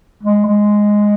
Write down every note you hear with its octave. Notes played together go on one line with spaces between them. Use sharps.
G#3
G#3